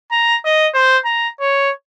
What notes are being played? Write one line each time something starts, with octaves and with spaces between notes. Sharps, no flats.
A#5
D#5
C5
A#5
C#5